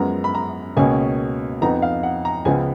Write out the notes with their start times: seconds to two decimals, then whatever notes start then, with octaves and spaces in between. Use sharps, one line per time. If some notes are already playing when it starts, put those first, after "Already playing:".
Already playing: F#2 F3 G#3 B3 A#5
0.24 B5
0.35 A#5
0.76 C#2 B2 A#3 C#4 G#5
1.62 F2 F3 B3 D#4 A#5
1.82 F5
2.03 F#5
2.25 A#5
2.45 C#2 C#3 F3 B3 G#5